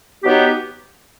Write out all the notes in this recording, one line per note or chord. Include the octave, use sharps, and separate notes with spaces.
B2 F#3 B3 D#4 G4